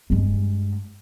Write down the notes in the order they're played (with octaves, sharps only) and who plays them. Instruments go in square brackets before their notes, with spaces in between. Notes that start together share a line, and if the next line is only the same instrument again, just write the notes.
[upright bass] G2 G#3